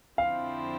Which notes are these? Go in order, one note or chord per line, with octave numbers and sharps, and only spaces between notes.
F2 D3 F3 C4 E4 F5